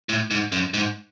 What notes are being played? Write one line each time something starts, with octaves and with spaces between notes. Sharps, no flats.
A2
G#2
F#2
G#2